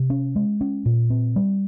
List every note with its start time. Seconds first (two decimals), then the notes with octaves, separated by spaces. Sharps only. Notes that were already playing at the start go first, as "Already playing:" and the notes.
Already playing: C3
0.10 C#4
0.36 G#3
0.61 C#4
0.86 A#2
1.10 C4
1.36 G3